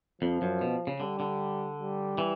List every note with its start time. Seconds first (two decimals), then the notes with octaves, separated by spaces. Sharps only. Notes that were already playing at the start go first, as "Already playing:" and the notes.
0.21 F2 F3
0.42 F#2
0.61 B2
0.87 C#3
1.00 D3 G3
1.20 D3
1.79 G3
2.18 E3